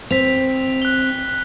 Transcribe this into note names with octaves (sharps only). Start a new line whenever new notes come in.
C4 B6 F7
F#6 G7